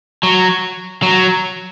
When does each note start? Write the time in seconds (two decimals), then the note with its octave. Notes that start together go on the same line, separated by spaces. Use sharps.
0.23 F#3
1.02 F#3